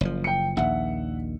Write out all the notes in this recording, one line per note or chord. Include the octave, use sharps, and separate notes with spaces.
F#1 F3
G5 C#7
A#1 D#2 E5 F#5